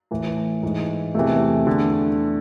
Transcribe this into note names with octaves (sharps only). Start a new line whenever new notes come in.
A2 E3
G#2 E3
E2 C3 E3 A3
E2 D3